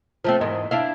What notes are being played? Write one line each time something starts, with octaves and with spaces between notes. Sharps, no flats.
F3 A3 C4
E2 G#2 D#3
D4 E4 F5